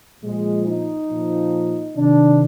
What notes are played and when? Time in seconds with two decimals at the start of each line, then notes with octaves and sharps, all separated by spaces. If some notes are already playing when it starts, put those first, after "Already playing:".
0.23 A#2 F3 G#3
0.66 D#4
1.09 A#2 F3
1.95 C3 D#3 D4